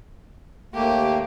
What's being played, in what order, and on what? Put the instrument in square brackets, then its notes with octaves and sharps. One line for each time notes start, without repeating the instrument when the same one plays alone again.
[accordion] D#2 A3 A#3 [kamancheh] G4